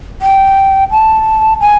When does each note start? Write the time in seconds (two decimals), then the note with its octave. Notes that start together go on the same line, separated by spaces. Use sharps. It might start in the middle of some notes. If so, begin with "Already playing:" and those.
0.22 G5
0.91 A5
1.61 G#5